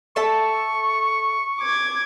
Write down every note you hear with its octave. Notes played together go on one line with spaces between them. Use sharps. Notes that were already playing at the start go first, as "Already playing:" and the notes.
A4 E5 A5 C#6
D6 G#6